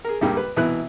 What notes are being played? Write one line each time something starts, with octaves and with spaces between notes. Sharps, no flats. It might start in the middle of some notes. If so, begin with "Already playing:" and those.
G#4 A#4
C#2 G2 G3 A#3
B4
C2 B2 E3 B3 E4 F#6